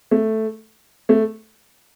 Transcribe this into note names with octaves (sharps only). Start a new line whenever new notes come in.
A3
A3